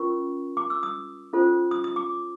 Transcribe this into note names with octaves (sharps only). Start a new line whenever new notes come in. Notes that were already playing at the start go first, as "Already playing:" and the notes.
Already playing: C#4 F4 A#4 C#6
D6
E6
D#6
C#4 F4 A4 C5
D#6
D#6
D6